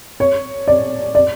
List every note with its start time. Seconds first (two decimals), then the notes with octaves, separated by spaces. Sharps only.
0.20 C#5
0.68 D5
1.15 D5